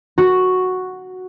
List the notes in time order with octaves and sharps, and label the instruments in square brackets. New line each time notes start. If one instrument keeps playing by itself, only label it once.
[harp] F#4